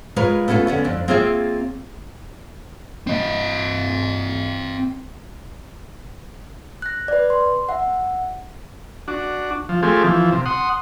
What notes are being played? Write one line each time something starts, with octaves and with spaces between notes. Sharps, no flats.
G#3 F4 A#4 B4 C#5
A3 B3 C#4 F4 A4
D3 B3 C#4
F2 D4
A#3 C4 F4 G#4 C#5 E5
C4 D#5
F#6 A#6
B4 D5
C6
E5 F#5
D4 F#4
F3
A3 C4 F4 G4 G#4
E3 F3
C3
F#5 C6 D#6